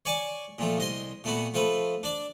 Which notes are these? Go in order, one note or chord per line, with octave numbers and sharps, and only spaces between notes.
C#5 D5 G#5 C#6 D6
A#2 F3 A3
C2 D#5 C6
A#2 A3 B3 F#4
F3 A3 C4 B4
D4 D5 D6